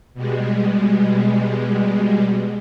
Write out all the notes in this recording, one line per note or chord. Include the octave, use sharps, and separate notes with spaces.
B2 G3 G#3